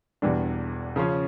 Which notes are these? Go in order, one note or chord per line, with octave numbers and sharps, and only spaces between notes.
E1 E2 E3 G3 D4
C#3 F3 C#4